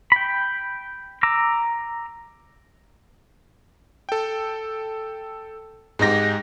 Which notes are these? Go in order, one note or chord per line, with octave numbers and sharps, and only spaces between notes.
G5 B5
A#5 D6 E6
A4 G5
G#2 G#3 D#4 G4 A#6